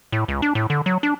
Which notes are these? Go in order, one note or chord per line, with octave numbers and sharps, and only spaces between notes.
A2
C#2
D4
A2
D3
F#3
D4